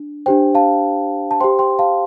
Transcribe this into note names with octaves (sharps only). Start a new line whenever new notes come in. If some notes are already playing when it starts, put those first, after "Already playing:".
Already playing: D4
D4 G4 C5 G5
F5 A5
A5
G4 C5 G5 C6
G5 C6
F5 A5